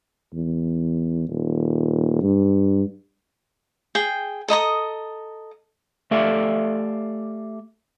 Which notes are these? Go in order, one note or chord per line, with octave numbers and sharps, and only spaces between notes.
E2
D#1
G2
G#4 G5
A4 D#5 A#5 D#6
A3 G4 A4 D5 E5 F5